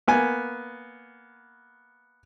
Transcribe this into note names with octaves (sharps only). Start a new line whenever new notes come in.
A#3 B3 G#5